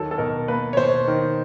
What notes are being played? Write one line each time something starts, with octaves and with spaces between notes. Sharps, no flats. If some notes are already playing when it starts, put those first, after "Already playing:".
Already playing: D#2 F#3 A4
A4
B2 A#4
A#3 B4
C#5
B2 C5
D#3